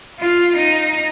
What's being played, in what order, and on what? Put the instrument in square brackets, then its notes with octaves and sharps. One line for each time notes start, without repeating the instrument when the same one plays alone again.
[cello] F4
D#4